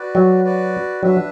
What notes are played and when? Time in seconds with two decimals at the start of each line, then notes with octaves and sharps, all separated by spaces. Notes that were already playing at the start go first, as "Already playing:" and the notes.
Already playing: F#4 B4 D5
0.15 F#3
0.43 F#4 B4 D5
1.02 F#3 D4 B4 E5